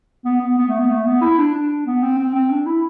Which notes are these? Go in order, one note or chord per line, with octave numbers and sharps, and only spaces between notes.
B3
B3
B3
A3
B3
A3
B3
E4
D4
D4
B3
C4
C4
C4
D4
E4